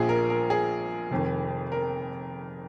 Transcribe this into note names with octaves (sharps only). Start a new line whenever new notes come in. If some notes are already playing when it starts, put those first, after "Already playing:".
Already playing: A#1 A#2 F3 G#4
A#4
A#4
G#4
F1 F2 D#3
A#4